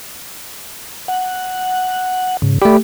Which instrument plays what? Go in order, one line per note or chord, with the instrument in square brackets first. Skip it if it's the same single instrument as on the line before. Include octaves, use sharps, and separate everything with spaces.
[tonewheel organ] F#5
G#2 C#3
[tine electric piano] A3 G4 [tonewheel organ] D5 B5